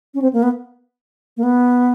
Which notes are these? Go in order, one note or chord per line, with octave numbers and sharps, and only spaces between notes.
C#4
C4
A#3
B3
A#3
B3